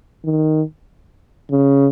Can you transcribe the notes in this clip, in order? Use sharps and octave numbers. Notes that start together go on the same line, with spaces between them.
D#3
C#3